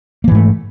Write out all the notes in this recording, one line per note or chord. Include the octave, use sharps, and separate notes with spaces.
G#2 E3 A3 A#3